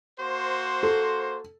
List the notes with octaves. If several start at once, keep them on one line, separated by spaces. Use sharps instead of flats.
A#3 F#4 C5
A4